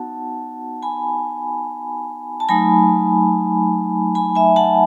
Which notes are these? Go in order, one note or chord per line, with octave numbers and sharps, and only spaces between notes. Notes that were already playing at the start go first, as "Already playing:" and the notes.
Already playing: B3 D#4 F#4 F#5 A5
G#5 B5
A5
F#3 A3 D#4 G#5 B5
G#5 B5
E5 G#5
F#5 A5